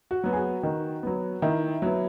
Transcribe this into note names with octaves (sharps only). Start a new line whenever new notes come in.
F#4
F#3 B3
G#4
F#4
D#3
F#3 B3
D#3 E4
F#3 B3